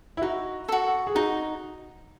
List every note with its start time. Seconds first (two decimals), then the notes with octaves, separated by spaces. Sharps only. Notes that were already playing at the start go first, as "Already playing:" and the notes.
0.17 E4
0.22 D#4 F#4
0.68 F#4 A4
1.07 G#4
1.15 D#4 F#4